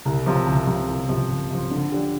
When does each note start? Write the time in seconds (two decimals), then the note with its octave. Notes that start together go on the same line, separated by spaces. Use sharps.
0.06 C2
0.26 C3 F3
0.47 C2
0.67 C3 F3
0.88 C2
1.09 C3 F3
1.30 C2
1.50 C3 F3
1.71 D3
1.92 F3 D4 G4